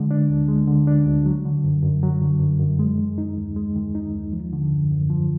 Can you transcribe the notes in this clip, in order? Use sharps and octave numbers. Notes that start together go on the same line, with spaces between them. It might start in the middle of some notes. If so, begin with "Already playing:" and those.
Already playing: D3 G#3
D4
D2
G#3
D3
D4
D2
F#3
D3
F#2
F#2
F#3
D3
F#2
F#2
G#3
D#3
D#4
D#2
G#3
D#3
D#4
D#2
F3
D3
F#2
F#2
F3